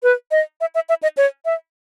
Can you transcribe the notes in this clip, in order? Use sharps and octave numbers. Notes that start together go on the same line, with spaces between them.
B4
D#5
E5
E5
E5
D#5
C#5
E5